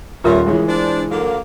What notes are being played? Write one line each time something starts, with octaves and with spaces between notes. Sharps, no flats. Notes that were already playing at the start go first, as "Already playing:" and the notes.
D#1 G3 A3 C#4 F4 A#4 E5 C6
C#3 E3 G#3
D4 C5
D3 F#3 A#3